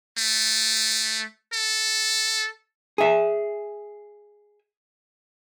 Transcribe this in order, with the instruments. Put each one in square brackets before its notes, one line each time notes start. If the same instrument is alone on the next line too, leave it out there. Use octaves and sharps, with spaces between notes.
[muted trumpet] A3
A4
[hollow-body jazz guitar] G#4 E5